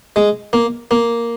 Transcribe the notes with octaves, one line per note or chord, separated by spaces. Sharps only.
G#3
A#3
A#3